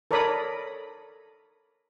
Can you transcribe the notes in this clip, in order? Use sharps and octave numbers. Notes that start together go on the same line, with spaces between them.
A4 A#4 C#5 D5 B5 D#6